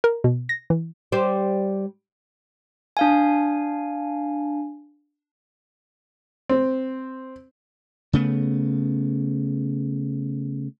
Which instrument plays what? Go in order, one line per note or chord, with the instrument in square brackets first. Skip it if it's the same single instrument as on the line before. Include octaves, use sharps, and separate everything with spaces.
[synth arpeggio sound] A#4
B2
A#6
E3
[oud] G3 C5
[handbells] D4 F5 G#5
[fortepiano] C4
[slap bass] C#3 A3 B3